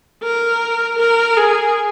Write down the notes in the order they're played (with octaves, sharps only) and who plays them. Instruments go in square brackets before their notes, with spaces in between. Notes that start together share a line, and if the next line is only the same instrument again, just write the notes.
[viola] A#4
A#4
G#4